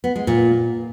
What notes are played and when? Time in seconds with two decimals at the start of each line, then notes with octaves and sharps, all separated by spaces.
0.04 B3
0.16 G#3
0.27 A#2